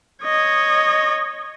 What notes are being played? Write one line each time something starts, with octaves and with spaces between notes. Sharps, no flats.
C#5 D#5